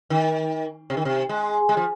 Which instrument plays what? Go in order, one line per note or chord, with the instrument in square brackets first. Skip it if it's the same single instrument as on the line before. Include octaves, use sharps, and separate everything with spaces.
[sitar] D#3
C3
D#3
C3
G#3
G#3
F3